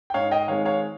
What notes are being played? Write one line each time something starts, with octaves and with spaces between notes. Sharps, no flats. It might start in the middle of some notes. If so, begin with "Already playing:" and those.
G5
G#2 C#5 F5
D#5 G5
D#3 G#3 C4 C#5 F5
C#5 F5